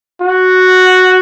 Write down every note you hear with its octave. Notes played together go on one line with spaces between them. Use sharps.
F#4